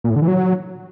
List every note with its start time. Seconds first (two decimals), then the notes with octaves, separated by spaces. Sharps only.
0.04 A#2
0.10 A2
0.16 D3
0.22 E3
0.28 F#3